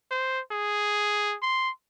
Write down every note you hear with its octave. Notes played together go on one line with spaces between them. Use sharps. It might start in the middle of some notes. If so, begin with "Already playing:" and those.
C5
G#4
C6